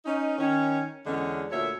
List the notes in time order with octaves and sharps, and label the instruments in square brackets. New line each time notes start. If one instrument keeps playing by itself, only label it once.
[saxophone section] C#4 D#4
D#3 C#4
E2 D3 G#3 C#4
D2 A#2 A4 C#5 E5